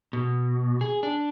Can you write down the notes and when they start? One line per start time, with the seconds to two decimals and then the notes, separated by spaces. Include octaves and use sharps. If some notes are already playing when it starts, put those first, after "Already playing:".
0.13 B2
0.81 G#4
1.03 D4